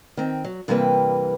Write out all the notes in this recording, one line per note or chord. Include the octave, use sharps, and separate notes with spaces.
D#3 C4
F#3
G2 C3 E3 G3 A#3 B4